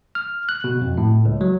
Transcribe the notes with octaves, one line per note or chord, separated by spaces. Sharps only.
F6
F#6
B2
F2
A2
C#2
F#3